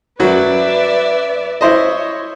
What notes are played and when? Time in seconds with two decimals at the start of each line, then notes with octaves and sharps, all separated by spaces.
0.20 F#2 F#3 B4 D5 E5
1.61 E4 C5 C#5 D#5